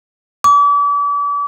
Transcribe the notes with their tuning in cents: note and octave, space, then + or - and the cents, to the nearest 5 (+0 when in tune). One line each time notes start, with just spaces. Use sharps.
D6 -40